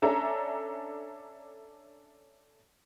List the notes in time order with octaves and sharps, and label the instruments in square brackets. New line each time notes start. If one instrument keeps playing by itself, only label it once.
[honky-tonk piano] C#4 D4 A4 E5 A#5